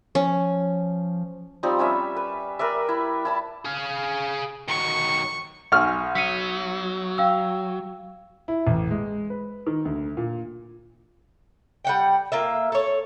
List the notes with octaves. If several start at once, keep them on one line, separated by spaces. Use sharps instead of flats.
F3 C#4
F3 G3 C4 D#4
G3 C#4 E5
B4
A#4 B4 D5 E5
E4
E4 A5 B5
G#4 F5
D#3 F#3 C#6
B1 G#5 C6 C#6 F6
F#3 B6 C#7 D#7
F5 G5 E6
E4
A1
G#3
B4
D#3
D2
A#2
G3 F#5 G5
A#3 F4 E5
A4 C#5